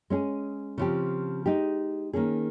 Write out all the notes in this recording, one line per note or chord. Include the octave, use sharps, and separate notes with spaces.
G#3 C#4 G#4
C#3 F3 C4 G4
G#3 D#4 G4
D#3 A#3 C#4 G#4